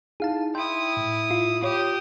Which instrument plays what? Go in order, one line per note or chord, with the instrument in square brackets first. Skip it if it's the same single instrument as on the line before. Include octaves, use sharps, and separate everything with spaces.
[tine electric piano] D#4 E4 [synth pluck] G#4 F5 A5
[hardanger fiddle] E4 D#6 [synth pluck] G5 [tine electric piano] C6
[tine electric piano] A2
[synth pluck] F4
[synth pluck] F4 C#5 [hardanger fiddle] G4 D#6